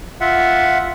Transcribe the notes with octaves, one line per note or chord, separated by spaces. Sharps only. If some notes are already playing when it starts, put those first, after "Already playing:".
F4 E5 F#5